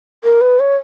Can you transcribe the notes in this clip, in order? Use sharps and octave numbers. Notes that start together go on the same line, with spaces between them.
A#4
B4
C#5